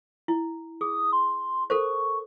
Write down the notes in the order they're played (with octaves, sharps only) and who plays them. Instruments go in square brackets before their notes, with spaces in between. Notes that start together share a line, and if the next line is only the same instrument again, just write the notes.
[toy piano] E4
[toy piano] G#4 [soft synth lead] D#6
[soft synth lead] C6
[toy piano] A4 A#4 C5 [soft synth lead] C#6